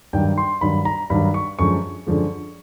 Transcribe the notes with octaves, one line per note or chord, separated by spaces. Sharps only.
G2 D#3 F#3 G5
C6
G2 D#3 F#3 B5
A#5
G2 D#3 F#3 B5
C#6
F#2 D3 F3 G#3 C#6
F#2 D3 F3 G#3